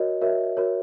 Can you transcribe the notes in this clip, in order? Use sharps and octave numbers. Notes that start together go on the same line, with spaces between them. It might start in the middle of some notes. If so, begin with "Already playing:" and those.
Already playing: F#4 A#4 C#5 D#5
F#4 A#4 C#5 E5
F#4 A#4 C#5